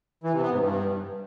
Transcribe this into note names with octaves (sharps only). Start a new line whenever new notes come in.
E3
C3
B3
G#2
G2